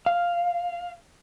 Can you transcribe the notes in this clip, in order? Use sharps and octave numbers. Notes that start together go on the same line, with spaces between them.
F5